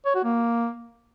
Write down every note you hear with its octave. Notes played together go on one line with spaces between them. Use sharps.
C#5
F#4
A#3